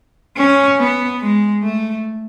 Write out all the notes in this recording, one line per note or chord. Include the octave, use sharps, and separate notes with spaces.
C#4
B3
G#3
A3